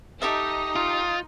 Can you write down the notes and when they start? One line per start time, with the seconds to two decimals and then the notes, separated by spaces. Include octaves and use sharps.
0.22 D#4 G4 A4 E5 D#6
0.76 F4